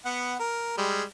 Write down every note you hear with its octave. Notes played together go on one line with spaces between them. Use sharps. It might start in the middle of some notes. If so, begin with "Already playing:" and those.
B3 F#5
A#4
G3 G#3